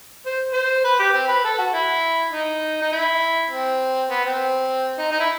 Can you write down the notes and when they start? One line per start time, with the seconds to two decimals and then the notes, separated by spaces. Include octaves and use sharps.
0.26 C5
0.53 C5
0.84 B4
0.99 G4
1.14 C4
1.28 B4
1.44 A4
1.58 F#4
1.73 E4
2.32 D#4
2.82 D#4
2.92 E4
3.51 C4
4.10 B3
4.25 C4
4.98 D#4
5.11 D#4
5.20 E4